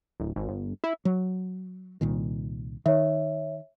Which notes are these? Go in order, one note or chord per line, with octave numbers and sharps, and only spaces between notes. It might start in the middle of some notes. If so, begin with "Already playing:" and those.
D1
G#1
G1
E4
F#3
C2 A#2 D#3
D#3 C#5 E5